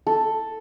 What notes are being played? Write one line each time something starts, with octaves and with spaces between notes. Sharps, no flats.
A4